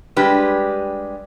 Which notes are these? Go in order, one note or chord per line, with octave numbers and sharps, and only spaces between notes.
G3 G#3 D4 G4 B4